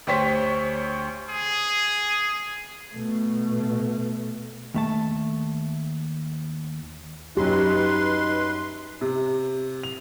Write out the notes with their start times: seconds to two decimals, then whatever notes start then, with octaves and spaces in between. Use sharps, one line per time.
0.07 D2 G4 C5 C#5 B6
1.30 G#4
2.94 B2 A3
4.74 D#2 A3 A5
7.37 F#2 F#3 D#4 G4 B4 C6
9.01 C3
9.83 F7